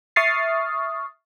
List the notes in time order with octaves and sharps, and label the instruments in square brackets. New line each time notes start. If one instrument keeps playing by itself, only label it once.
[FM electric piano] E5 C#6 D#6 F6 A6 C7